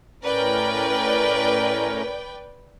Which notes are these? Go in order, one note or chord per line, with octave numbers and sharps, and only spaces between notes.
A2 C#4 A#4 B4 D5 G5